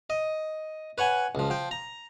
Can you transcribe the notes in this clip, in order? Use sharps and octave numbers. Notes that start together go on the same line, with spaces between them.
D#5
B4 C#5 F#5 G#5
C#2 F3
F3 G5
A#5